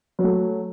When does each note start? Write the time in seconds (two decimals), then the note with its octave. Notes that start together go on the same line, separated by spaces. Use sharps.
0.19 F#3
0.24 A3